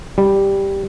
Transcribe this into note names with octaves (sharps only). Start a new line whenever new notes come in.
G3